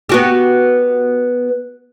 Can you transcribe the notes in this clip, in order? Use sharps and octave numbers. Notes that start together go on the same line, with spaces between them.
B3 F#4 G4